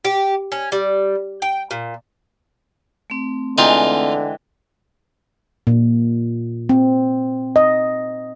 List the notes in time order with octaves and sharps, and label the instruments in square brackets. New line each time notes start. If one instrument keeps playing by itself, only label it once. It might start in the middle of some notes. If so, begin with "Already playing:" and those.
[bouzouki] G4
C#4
G3
G5
A#2
[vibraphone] A3 C4
[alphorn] D3 [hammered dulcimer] E3 G#3 G5 [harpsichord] D#4 F4
[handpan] A#2
C4
D#5